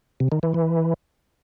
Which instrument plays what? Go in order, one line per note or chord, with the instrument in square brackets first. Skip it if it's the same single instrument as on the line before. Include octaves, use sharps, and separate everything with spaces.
[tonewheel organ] C3
D#3
E3
E3